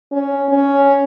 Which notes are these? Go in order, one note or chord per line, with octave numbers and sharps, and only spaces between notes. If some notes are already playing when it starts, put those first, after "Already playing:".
C#4
C#4